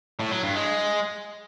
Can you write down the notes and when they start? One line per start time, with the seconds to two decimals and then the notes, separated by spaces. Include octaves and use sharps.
0.19 A2
0.31 F#3
0.43 G2
0.55 G#3